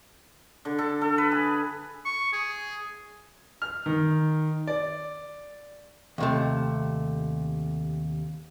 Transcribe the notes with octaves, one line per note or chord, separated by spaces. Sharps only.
D3
A4
A4
B4
G#4
C#6
G#4
F6
D#3
D5
D#2 C3 A3